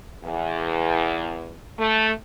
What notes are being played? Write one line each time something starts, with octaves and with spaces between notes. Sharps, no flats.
E2
A3